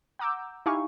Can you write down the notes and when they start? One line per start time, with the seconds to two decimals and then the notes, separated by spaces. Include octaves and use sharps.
0.19 F#5 A#5 D6 E6 G6
0.66 D#4 E4 G4 F5 G#5 C#6